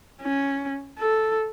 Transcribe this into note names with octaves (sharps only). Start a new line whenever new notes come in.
C#4
A4